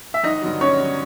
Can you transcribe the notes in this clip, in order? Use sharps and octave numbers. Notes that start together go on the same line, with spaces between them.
E5
G#1 D#4 D#5
G2 D3 F#3
G#1 C#4 C#5
G2 D3 F#3